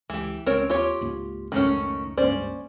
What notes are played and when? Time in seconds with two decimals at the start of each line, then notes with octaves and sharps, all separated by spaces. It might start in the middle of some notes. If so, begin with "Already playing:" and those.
0.10 C#2 E3 G4
0.46 C#2 C4 C#4 A#4 C#5
0.69 D#2 F4 G4 C#5
1.01 C#2 G#2 A#3
1.52 C#2 F#2 A2 D#3 A3 C#4
2.18 C#2 G2 A#3 C#4 C5 D5